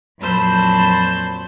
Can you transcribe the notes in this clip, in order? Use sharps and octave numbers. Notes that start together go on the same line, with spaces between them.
F2 A#2 F#3 C5 A5 B5